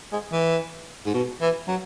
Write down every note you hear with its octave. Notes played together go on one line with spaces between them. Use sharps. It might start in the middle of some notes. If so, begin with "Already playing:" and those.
G#3
E3
G#2
B2
E3
F#3